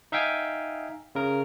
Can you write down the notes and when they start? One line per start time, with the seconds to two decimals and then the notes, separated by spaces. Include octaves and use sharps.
0.12 D#4 E5 F5 G5 G#5
1.15 C#3 A#4